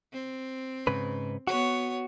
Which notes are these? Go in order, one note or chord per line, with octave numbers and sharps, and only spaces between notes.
C4
G#2 C#3 B4
B3 F#4 C#5